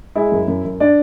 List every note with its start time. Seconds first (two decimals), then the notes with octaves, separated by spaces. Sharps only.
0.15 G#3 E4 E5
0.32 F#2
0.48 F#2
0.64 F#2
0.80 D4 D5